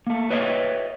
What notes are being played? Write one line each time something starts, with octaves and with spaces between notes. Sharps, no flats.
A3 A#3
B4 C#5 D#5 E5